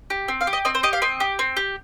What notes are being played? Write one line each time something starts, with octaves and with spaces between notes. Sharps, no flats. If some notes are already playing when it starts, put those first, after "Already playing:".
G4
C4
F5
G4
D#5
C4 D#5
C5
G4 D#5
F5
C4 D#5
G4
C4
G4